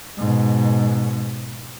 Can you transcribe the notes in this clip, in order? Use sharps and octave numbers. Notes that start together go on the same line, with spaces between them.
G#2 B2